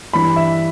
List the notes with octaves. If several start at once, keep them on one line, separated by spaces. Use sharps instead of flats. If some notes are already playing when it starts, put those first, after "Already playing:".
G2 E3 G3 B5
E5